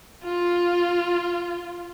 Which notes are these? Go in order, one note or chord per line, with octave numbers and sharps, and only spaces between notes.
F4